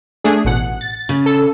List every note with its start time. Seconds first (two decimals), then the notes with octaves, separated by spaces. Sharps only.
0.24 A3 D4 G#4
0.45 A1 B2 F#5
0.81 A6
1.09 C#3
1.26 A4